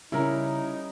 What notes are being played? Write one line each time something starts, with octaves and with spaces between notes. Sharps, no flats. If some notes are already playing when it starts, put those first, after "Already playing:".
C#3 G3 C#4 D#4 E4 A#4 A#5